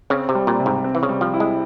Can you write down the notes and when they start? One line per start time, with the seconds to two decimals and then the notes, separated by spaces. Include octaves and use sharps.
0.10 C#3 C4
0.29 C3
0.35 G3
0.47 A#2
0.60 C3
0.66 G#2
0.84 C4
0.95 E3
1.03 C#3
1.09 G3
1.21 F3
1.34 E4
1.40 G#3